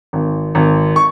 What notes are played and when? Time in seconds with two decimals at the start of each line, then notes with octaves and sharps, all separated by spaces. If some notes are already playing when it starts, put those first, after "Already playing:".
0.13 G#1
0.55 G#1
0.96 C#6